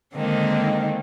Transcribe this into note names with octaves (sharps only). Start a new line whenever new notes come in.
D3 D#3 G#3 A#3 C4 D#4